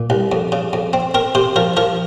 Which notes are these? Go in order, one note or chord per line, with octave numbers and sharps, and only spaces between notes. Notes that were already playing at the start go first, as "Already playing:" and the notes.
Already playing: A#2
C2
F2
C#3
F2
C4
C4 A#4
C3 C5
F3 A#4
F3 A#4